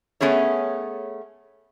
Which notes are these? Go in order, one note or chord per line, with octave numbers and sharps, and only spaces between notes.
A3 B3 C#4 G#4 C#5